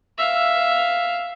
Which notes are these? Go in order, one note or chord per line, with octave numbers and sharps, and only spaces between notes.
E5 F5